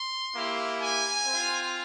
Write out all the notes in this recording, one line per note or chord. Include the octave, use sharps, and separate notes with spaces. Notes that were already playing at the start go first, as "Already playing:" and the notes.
Already playing: C6
A#3 E4 G4
G#5
C4 F4